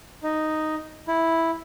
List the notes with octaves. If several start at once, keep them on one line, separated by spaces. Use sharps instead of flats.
D#4
E4